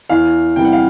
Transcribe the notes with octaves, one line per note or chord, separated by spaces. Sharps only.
E2 F5
C3 E3 G3 G5
F#5
F5